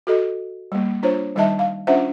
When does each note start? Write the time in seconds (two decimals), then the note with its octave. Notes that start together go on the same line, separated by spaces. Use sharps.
0.07 F#4 A4 D#5
0.72 G3 A#3
1.03 D4 F4 C5 C#5
1.35 D#3 G3 D#4 D#5 E5 A5
1.59 F5
1.87 C#4 D4 F4 C5 E5 F#5